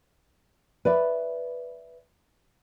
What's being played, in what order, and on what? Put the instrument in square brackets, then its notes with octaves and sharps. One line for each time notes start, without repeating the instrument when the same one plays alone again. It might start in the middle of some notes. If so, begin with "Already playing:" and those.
[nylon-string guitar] B4 D5 E5